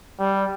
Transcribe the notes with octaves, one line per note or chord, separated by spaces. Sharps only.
G3